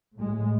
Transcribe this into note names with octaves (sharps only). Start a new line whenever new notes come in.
A2 G#3